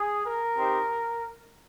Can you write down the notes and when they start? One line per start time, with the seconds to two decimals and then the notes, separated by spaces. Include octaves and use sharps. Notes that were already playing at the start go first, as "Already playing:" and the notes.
Already playing: G#4
0.24 A#4
0.57 C4 D#4 G4